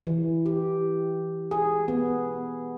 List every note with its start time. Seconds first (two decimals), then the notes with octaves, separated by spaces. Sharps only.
0.07 E3
0.46 G4
1.51 G#4
1.88 B3